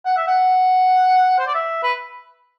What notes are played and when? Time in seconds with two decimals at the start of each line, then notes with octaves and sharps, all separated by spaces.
0.05 F#5
0.17 E5
0.28 F#5
1.39 C5
1.47 D5
1.54 E5
1.83 B4